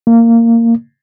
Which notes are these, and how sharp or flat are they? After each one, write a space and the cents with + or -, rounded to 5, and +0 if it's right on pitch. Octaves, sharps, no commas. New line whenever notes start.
A#3 -15